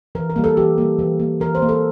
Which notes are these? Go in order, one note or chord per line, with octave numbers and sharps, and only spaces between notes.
E3 A#4
A#4
G3 A#3
A4
E3 G4
G3 A#3
E3
A#3
E3 A#4
C5
A#3
A4